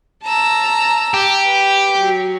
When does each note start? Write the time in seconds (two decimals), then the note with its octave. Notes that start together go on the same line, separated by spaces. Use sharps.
0.24 A5 A#5 E6
1.14 G4
1.45 B4
1.98 F#3